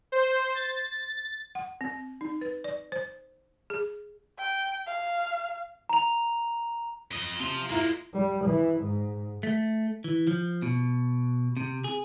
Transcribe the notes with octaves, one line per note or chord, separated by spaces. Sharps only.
C5
A6
F#5
C4
D#4
B4
D5
C5
G#4
G5
F5
A#5 F7
F2 D#5
C3 F3 F4
G#3 A#3 E4 F4 A#5
G3
E3
G#2
A3
E3
F3
B2
C3
G#4